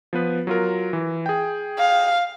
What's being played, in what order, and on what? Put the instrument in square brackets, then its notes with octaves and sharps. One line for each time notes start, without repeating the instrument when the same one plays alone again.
[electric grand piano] F3 B3 B4
F#3 F4 A#4
E3
G#4 G5
[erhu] F5